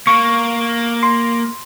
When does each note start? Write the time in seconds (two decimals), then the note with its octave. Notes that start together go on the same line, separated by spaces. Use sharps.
0.07 A#3 C#6
1.03 C6